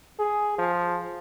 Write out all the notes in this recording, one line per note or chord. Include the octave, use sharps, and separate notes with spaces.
G#4
F3